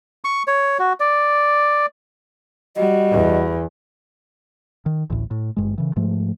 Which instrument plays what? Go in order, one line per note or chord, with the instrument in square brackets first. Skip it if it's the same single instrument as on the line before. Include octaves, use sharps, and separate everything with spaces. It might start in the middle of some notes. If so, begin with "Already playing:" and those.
[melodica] C#6
C#5
F#4
D5
[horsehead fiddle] G3 F#4 [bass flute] D#5
[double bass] E2
[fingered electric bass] D#3
A1 D2 A2
A2
G#1 G2 G#3
C#3 E3
G#2 F3 A3